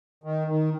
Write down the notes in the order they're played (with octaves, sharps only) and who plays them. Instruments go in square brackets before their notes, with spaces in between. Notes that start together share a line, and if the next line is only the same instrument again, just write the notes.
[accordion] D#3
D#3